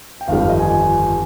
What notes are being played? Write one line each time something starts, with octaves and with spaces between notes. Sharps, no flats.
G5
G1 F2 D#3 G3 F5
F5
D#5
G#5
G#5